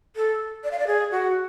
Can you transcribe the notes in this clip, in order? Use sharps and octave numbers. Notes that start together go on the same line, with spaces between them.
A4
D5
F5
D5
G#4
F#4